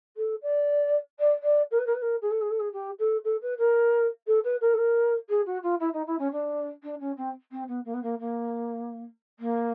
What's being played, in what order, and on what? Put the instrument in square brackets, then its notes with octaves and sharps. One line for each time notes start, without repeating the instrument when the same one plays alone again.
[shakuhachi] A4
D5
D5
D5
A#4
B4
A#4
B4
A#4
G#4
A4
G#4
A4
G#4
G4
A4
A4
B4
A#4
A4
B4
A#4
A4
A#4
G#4
F#4
F4
E4
D#4
E4
C#4
D4
D4
C#4
C4
C4
B3
A#3
B3
A#3
A#3
A#3